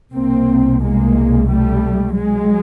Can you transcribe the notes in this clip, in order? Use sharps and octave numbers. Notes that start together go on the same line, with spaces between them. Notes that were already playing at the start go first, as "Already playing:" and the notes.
C2 B2 A#3 C4
G#3 A#3
G3 A3
F#3 G#3